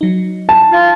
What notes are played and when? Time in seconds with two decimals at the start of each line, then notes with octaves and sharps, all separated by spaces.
0.01 F#3 D#4
0.49 A5
0.72 F4